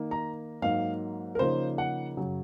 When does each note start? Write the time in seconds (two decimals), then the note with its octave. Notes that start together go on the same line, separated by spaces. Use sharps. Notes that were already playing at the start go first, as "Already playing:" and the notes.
Already playing: D#3 A#3 D#4
0.11 A#5
0.62 G#2 F#3 A#3 D#4 F5
1.35 A#4
1.39 C#3 F3 A#3 D#4 C5
1.78 F#5
2.17 F#2 C#3 F#3